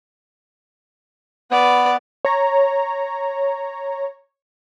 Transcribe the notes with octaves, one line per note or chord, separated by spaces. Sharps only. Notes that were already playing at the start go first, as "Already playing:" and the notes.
B3 B4 D5
C#5 A#5